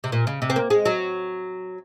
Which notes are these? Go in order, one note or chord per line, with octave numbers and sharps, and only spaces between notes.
C3
A#2
C#3
C3
C4
A#3
G#3
F#3